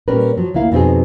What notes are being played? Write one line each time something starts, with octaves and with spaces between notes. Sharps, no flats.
A#2 G3 C#4 A#4 B4
F3 F#3
D2 A#3 E4 F5
F2 B2 C4 D#4 G#4